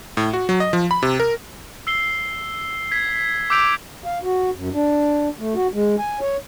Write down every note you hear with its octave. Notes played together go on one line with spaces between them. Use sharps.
A2
F#4
F#3
D#5
F3
B5
C3
A#4
E6 C7 G7
G#6 B6
D6 E6 G6 B6 D7 F7
F5
F#4
F#2
D4
A3
F#4
G#3
G#5
C#5